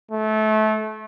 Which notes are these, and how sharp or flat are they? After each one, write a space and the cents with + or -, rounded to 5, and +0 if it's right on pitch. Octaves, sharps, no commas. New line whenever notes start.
A3 -25